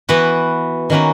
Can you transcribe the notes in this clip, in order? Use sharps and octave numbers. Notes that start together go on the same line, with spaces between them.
E3 B3 F#4 B4
D#3 A#3 C#4 F#4 B4